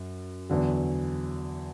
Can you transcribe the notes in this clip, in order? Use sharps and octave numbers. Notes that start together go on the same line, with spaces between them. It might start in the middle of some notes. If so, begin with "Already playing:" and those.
Already playing: F#2
E2 D3 F#3